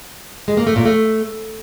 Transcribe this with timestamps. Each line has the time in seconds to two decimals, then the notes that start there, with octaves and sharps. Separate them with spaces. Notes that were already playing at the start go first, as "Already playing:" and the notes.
0.48 G#3
0.57 A#3
0.67 A3
0.76 A#2
0.85 A3